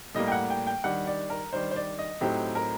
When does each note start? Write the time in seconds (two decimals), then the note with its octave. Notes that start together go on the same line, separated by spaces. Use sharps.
0.15 A2 G3 A#3 D#5
0.28 G5
0.32 F#5
0.50 G5
0.67 G5
0.84 D#3 G3 D4 F#5
1.07 D5
1.30 A#4
1.53 D#3 G3 D4 C5
1.71 C5
1.76 D5
1.99 D#5
2.21 A2 F#3 C4 D#4 G4
2.55 A#4